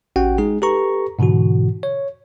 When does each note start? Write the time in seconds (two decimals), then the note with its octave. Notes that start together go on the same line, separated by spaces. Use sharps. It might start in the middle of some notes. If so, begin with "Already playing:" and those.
0.16 A1 C#4 F#4 F#5 G5
0.38 G#3 D#4 G#4
0.62 G4 A4 B4 A#5 C#6
1.19 G#2 B2 D3 E3 F#4
1.83 C#5